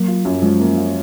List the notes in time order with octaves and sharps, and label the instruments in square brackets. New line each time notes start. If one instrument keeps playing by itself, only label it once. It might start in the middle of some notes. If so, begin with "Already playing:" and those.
Already playing: [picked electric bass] F#3 [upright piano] A#3
[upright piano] F4
F#2
[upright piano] F3 [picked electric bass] G#3
[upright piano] A#3
F4